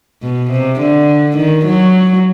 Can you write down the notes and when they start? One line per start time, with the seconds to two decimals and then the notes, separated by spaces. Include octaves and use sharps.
0.22 B2
0.51 C3
0.80 D3
1.37 D#3
1.66 F#3